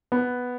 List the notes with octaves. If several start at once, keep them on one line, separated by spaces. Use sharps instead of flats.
B3